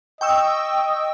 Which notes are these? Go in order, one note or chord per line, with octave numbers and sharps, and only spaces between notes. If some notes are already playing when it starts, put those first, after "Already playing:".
D#5 G5 C#6 E6